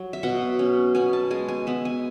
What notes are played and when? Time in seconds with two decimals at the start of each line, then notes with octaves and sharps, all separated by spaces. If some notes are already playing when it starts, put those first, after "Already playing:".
Already playing: F#3
0.13 E5
0.23 B2 F#5
0.59 C#4
0.95 B3 G#5
1.13 A5
1.31 G#3 G#5
1.48 G#5
1.67 B3 E5
1.85 G#5